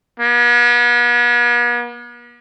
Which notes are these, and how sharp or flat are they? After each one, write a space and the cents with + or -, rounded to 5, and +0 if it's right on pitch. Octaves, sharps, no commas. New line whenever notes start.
B3 -45